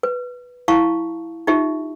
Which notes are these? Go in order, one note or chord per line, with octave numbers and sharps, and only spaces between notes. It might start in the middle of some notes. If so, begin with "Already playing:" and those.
B4
E4 F5 A5 A#5 C#6
D#4 F4 G4 E5